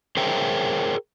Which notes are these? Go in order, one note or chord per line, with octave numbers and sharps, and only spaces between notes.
G#4 A#4 C5 C#5 E5 G5